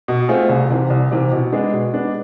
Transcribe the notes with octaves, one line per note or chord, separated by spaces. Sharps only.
B2
A3 C4 F4 G#4
C2
C3 E3
C2
C3 E3
B2
G#3 B3 D4
B2
G#3 B3 D4